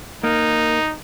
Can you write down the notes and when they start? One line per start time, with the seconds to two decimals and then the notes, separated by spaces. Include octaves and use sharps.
0.24 A#3 D#4